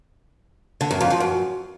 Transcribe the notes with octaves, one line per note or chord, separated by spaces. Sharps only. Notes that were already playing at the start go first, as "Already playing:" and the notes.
D3
F#2
F2
F3
F#2